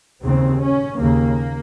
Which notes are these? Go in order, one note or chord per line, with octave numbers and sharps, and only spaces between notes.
D#2 C#3 C4
C#4
D#2 C#3 A#3